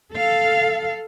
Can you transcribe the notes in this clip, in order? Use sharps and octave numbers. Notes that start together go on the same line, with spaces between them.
A4 F5